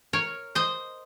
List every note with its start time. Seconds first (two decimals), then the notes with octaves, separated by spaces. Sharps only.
0.13 A#4 C#5
0.55 C5 D#5